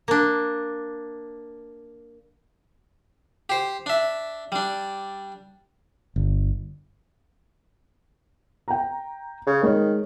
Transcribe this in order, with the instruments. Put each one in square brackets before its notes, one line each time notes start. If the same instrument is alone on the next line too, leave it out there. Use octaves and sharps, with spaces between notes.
[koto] A#3 D4
[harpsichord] G4 C5
D4 E5
G3 D4
[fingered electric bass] G1
[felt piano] G5 A#5
[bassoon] C#3
[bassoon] D#3 [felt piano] G#3 C#5